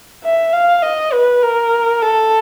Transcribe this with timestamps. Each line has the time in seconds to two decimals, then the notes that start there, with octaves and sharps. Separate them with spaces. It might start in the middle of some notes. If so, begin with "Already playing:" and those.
0.25 E5
0.53 F5
0.83 D#5
1.13 B4
1.42 A#4
2.02 A4